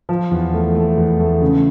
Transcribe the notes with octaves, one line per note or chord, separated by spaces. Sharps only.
F3
E2
A3
A3
E2
A3
C#3